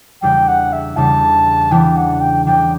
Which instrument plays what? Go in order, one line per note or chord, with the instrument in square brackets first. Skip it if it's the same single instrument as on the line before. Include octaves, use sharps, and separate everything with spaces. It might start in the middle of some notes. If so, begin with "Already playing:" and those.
[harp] E2 C#3 G3 D4 [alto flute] G5
[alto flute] F#5
E5
[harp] E2 C#3 G3 D4 [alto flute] A5
[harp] C#3 E3 B3 D4 [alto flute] G5
[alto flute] F#5
G5
[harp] C#3 E3 B3 D4 [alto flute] G5